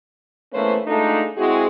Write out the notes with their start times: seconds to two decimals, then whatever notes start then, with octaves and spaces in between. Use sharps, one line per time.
0.53 E2 A3 A#3 C#4 B4 C5
0.86 G#3 A3 D4 D#4 F4 A4
1.36 G#3 C4 E4 F#4 G#4